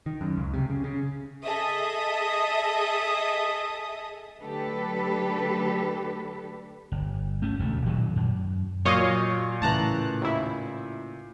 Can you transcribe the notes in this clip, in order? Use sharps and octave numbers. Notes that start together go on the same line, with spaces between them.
D#3
F#2
C#2
C3
C#3
C#3
G#4 A4 D#5 E5 D#6
D3 F#3 A3 G4 A4 B4
G1
A3 C#4
E1 D2 A3
A#2 D#3 E3 F#3
F#2
A#2 F#3 C#5 D#5 F5 C#6 D#6
A2 C#3 E3 A5 A#5 F#6
D#2 E4